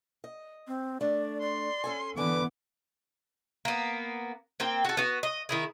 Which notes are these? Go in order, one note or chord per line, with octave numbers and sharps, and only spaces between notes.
D#5
C4
A3 D4 D5
D5 C6
C#4 A4 G#5
D3 E3 B3 B4 G#5 D6
A#3 B3
A#3 C4 G5
F#4 A4
B3 F#4
D#5
D#3 E4 G#4